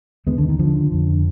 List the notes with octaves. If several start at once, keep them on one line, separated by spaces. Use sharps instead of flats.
D#2 D3 G#3 B3
D3
D#3
D3 F3
F2 D3